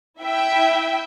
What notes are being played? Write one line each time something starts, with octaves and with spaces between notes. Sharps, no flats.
E4 E5 G5